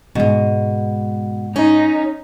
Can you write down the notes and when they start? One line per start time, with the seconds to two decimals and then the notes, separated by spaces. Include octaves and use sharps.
0.15 G#2 B2 G#3
1.56 C#4 D#4